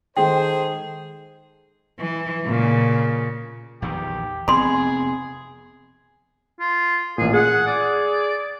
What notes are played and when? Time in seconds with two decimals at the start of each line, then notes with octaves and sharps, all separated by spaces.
0.17 D#3 G#3 G#4 A4 C5 G5
2.00 E3
2.46 A#2 C#3
3.82 A#1 E2 D#3 G4
4.48 F1 B3 C4 G#4 B5 C6
6.60 F4
7.18 A1 A#2 G#4
7.33 G#4 F#5
7.67 D5